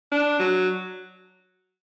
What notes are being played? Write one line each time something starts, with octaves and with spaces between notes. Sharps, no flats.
D4
F#3